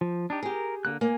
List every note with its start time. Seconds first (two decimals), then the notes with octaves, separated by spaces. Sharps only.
0.01 F3
0.30 D4 D#4 G4
0.43 G4 G#4 A#4
0.85 D3 A#3 F#6
1.01 A#3 G#5